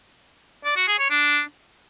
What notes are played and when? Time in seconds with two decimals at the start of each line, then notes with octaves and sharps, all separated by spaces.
0.65 D5
0.76 F#4
0.87 G#4
0.99 C#5
1.10 D4